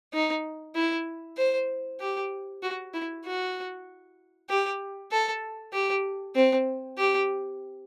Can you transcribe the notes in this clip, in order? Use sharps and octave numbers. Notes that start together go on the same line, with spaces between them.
D#4
E4
C5
G4
F#4
E4
F#4
G4
A4
G4
C4
G4